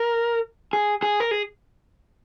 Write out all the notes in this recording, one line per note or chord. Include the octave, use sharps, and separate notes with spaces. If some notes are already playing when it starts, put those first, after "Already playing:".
Already playing: A#4
G#4
G#4
A#4
G#4